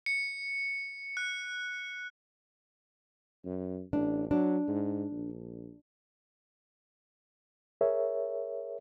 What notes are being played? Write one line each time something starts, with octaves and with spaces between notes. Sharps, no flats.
C#7
F#6
F#2
A1 D4
F#3 D4
G#2
A#1
G#4 A#4 C#5 E5